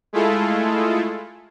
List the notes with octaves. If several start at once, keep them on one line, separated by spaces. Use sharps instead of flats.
G#3 A3 E4 F4 G#4 A4